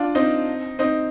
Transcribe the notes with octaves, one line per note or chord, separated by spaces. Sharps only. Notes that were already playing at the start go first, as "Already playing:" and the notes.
Already playing: D4 F4
C4 D#4
C4 D#4